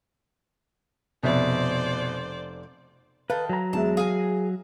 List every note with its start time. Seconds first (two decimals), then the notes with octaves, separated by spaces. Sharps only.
1.23 F1 B2 C5 D5 E5
3.30 D#3 A4 B4 F5
3.49 F#3 A#5
3.73 E2 G#3 E5 A5
3.97 G#4 F5 G#5